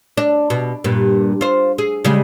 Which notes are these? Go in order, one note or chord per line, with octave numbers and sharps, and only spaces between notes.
D4
B2
G2 A#2
F4 C5
G#4
C#3 G3 G#3